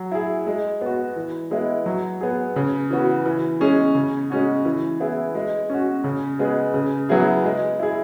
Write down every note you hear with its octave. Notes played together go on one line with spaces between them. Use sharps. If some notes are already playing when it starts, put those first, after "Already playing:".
Already playing: F#3
E4 G#4
G#3
B3 F#4
E3
G#3 B3 E4
F#3
B3 G#4
C#3
E3 B3 F#4
E3
G#3 C#4 G#4
C#3
G#3 C#4 F#4
E3
B3 E4 G#4
G#3
C#4 F#4
C#3
G#3 B3 G#4
C#3
F#3 B3 E4 G#4
G#3
E4 G#4